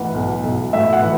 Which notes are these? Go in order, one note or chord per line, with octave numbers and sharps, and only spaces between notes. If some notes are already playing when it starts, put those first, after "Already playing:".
Already playing: B1 A2 E3 F#5
B1
B1
A2 E5
F#5
E3